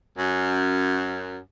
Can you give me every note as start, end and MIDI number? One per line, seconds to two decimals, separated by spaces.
0.17 1.37 42